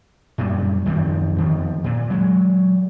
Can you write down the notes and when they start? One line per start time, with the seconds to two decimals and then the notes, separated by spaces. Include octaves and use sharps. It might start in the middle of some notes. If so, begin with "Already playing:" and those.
0.38 F#2 A#2 G3
0.86 F#2 D#3 F3 C4
1.37 F2 D#3 F3
1.84 A#2
2.10 F#3 G#3